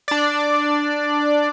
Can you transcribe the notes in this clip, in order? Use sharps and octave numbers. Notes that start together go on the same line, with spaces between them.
D4 D5